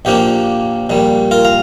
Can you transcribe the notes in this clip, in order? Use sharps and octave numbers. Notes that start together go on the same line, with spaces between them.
A#1 A#2 F3 A#3 D4 G4
A#1 A#2 G3
F4 A#4
F5 A#5